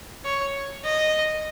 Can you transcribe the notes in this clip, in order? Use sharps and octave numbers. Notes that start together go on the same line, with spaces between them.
C#5
D#5